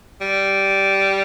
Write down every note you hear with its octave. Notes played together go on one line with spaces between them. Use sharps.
G3